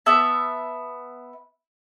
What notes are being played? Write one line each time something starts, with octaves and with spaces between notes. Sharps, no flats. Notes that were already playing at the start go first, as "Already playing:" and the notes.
B3 E5 A5